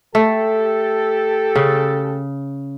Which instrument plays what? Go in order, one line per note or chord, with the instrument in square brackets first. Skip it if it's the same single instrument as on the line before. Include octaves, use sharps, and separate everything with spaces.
[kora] A3 [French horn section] G4 A4
[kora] C#3